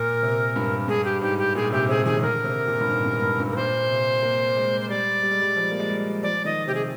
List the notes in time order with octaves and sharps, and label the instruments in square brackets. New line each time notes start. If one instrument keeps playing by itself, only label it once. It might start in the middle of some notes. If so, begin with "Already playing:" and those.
Already playing: [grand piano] A#2 [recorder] A#4
[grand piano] C3
G2
[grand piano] G2 [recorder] G#4
[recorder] G4
[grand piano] G#2 [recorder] G4
[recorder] G4
[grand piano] A#2 [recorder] G#4
[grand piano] C3 [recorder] G4
[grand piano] C3 [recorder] G#4
[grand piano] D#3 [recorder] G#4
[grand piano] C3
[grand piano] D3 [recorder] A#4
[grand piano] C3
A#2
G2
G#2
G2
G2
G2
[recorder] A#4
[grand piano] A#2 [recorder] C5
[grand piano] C3
A#3
G#3
[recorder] C5
[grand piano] G3 [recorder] D5
[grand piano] G3
G#3
G3
F3
A#3
G#3
G3
[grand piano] F3 [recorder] D5
[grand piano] D#3 [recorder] D#5
[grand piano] C3 [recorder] G4
[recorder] G#4